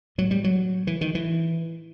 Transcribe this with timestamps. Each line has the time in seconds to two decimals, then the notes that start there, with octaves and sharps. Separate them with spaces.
0.18 A2 F#3
0.31 G3
0.44 F#3
0.87 E3
1.01 D#3
1.15 E3